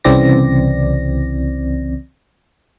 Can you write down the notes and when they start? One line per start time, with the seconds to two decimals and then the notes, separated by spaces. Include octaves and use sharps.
0.04 C2 C#3 E3 C4 D5 A#6